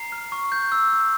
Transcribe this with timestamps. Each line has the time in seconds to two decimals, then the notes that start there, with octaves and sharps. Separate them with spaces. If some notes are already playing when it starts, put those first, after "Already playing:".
Already playing: A#5 C7
0.12 F6
0.32 C#6
0.52 G6
0.72 E6
0.92 E6